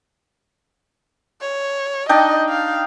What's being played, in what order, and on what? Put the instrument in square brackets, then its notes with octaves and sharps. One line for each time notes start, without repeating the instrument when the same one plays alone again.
[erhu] C#5
[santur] D4 D#4 G5 [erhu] D#5
[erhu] F5